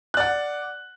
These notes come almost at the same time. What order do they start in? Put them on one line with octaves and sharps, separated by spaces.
F#6 D5 F#5